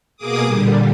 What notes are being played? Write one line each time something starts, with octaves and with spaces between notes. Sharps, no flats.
B2 A#3 G#4 D6 D#6
A#2 D3 G3